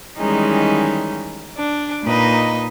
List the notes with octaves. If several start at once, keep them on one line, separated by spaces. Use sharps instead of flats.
D#3 E3 G3 G#3 C#4 D#4
D4
A#2 A#3 D#4 B4 D#5